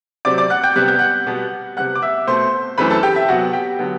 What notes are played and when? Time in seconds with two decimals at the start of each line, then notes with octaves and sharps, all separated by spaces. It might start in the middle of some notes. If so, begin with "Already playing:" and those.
0.25 C3 F#3 C4 D5 D6
0.38 D5 D6
0.50 F#5 F#6
0.63 G5 G6
0.76 C3 G3 B3 F#6
0.88 G6
0.99 F#5 F#6
1.27 B2 G3 B3
1.76 C3 G3 B3 F#5 F#6
1.95 D6
2.02 E5 E6
2.27 B2 A3 C4 C5 C6
2.78 F#2 E3 A3 C4 B4 B5
2.90 A4 A5
3.03 G4 G5
3.16 E5
3.28 C3 F#3 B3 F#4 F#5
3.53 G4 G5
3.79 D3 F#3 B3